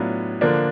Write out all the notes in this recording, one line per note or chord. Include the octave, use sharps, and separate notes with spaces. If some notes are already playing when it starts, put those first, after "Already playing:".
Already playing: A2 F#3 B3 D4 F4
D3 F3 A#3 D4